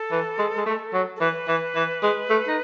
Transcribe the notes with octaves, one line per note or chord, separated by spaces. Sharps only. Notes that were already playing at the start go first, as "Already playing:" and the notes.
Already playing: A4
E3
G#3
G#3
A3
F#3
A4
E3 B4
E3
E3
G#3
A3
D#4